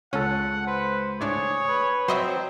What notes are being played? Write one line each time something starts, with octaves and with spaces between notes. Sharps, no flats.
C#2 C#4 A4 F#5
B4 C5
A2 D4 G#4 C#5
B4
F#3 C4 C5 D#5 E5